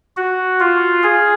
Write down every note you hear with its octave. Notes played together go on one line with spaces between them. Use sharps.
F#4
F4
G#4